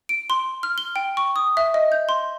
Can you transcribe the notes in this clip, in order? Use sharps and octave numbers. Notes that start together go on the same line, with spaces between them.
D7
C6
F6
G7
G5
C#6
D#6
E5
D#5
G6
C6